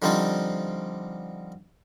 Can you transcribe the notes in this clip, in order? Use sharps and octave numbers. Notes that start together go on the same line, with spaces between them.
D3 F3 G3 C4 D#4 F4